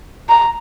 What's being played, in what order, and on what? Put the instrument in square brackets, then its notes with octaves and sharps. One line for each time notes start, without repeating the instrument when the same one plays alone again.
[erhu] A#5